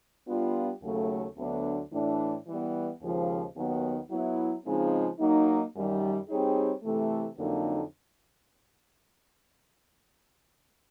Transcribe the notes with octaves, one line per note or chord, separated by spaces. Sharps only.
G3 B3 D4 F4
D#2 C#3 F#3 A3
D2 D3 F#3 B3 D4
A2 E3 A3 D4
E3 G3 B3
D#2 C#3 F3 G#3
D#2 D#3 F#3 B3
F#3 B3 E4
C#3 F3 G#3 C4 D#4
F#3 A#3 D#4
F#2 D#3 G3
G3 C4 D#4 G#4 C#5
C3 E3 A3
F2 D3 F#3 A#3 D#4